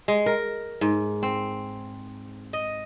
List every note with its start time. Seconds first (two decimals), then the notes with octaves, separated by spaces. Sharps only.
0.08 G#3
0.26 A#4
0.81 G#2
1.23 C4
2.53 D#5